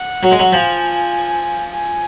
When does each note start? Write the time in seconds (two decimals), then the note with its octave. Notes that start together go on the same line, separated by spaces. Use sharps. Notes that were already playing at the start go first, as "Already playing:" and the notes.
Already playing: F#5
0.23 F#3
0.31 G#3
0.39 F#3
0.52 F3 G#5
1.73 G#5